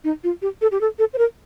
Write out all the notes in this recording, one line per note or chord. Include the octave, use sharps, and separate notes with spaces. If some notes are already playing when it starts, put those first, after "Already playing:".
D#4
F4
G4
A4
G4
A4
A4
C5
A#4